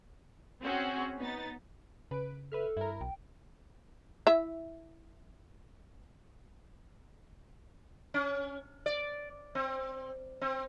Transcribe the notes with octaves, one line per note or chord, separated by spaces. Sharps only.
C4 C#4 F#4 G#4
B3 D#4 A6
C#3 B4 D7
A4 B4 E5 F6
G2 E4 A#4
B1 G5
E4 E5
C#4
D5
C4
C4